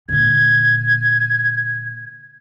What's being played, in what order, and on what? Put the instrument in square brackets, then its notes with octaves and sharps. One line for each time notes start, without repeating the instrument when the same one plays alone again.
[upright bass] A#2 D3 [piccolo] G#6